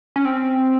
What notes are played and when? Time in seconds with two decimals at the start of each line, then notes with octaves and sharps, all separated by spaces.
0.16 C#4
0.25 C4